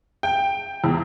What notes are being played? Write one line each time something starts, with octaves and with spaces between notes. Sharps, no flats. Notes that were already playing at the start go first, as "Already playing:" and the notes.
G5
E2